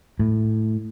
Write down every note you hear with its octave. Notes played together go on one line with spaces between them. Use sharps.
A2